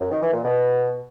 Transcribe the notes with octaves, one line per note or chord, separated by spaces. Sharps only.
F#2
D#3
E3
A#2
B2